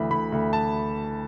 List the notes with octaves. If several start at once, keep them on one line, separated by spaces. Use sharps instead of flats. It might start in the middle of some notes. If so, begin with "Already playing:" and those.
Already playing: D2 E3 B5
D2 B5
D2
A5